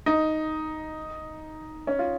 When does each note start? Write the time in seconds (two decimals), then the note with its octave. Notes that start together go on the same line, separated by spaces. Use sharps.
0.06 D#4
1.87 C#4
1.99 F4